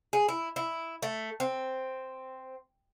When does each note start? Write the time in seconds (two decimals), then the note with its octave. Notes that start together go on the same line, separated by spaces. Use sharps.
0.13 G#4
0.29 E4
0.56 E4
1.02 A3
1.40 C4